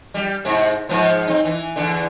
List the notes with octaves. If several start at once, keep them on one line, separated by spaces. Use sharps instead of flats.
G3 G4
G#2 C3 E4
G#2 F3 B3
C4 D#4
E3
E2 D3